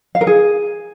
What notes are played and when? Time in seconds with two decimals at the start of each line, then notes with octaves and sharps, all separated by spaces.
0.15 F5
0.21 A#4
0.27 G#4